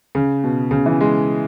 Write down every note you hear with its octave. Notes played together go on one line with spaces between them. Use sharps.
C#3
B2
C#3
E3
G#3